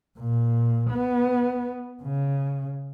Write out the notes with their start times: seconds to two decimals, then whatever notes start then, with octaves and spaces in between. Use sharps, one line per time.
0.18 A#2
0.91 B3
2.02 C#3